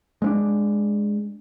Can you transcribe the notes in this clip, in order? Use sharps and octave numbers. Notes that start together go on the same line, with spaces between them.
G#3 C4 D4